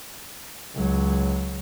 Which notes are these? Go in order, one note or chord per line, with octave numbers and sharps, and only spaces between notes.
C#2 F#3